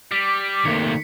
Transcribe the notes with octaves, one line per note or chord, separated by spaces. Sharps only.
G3 D6 B6
C2 C3 D#3 A3 A#3 C#7